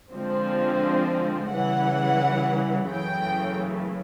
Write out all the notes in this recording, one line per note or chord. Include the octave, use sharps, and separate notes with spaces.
D3 F3 G#3 C4
C#3 E3 G3 F#5
F#2 C#3 E3 A3 G5